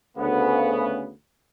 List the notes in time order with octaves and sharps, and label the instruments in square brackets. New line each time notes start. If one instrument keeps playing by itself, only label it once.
[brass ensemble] D2 C#3 B3